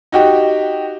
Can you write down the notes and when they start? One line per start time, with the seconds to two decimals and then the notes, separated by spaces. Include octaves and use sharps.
0.12 D#4 F#4 G4